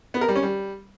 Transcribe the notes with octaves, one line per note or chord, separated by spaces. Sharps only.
B3
A#4
G3
C#4
G3